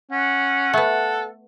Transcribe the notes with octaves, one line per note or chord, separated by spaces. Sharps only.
C#4 F#5
A3 B3 A4